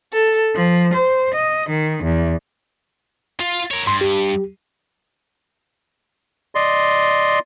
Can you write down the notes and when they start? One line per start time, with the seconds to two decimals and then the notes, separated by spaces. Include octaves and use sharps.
0.15 A4
0.55 F3
0.93 C5
1.35 D#5
1.69 D#3
2.03 E2
3.40 F4
3.71 A#4 C#5
3.87 G2 C6
4.01 G4
6.55 D5 D#5 C6